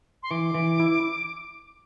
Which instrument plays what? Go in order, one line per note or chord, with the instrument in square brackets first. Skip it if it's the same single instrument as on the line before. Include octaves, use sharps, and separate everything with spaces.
[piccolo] C6
[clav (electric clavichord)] E3 [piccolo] D6
[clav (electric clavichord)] E3
E4